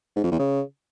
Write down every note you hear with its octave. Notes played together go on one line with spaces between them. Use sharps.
G#2
F2
E2
C#3